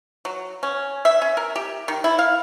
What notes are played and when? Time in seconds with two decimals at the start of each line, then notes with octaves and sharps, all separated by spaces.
0.25 F#3
0.63 C#4
1.05 E5
1.22 C#4
1.37 A#4
1.56 G4
1.88 D#3
2.04 E4
2.19 F5